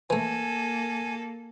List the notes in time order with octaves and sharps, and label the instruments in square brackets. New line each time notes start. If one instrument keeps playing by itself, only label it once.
[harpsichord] E3 A3 [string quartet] A#3 A4 [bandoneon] G#5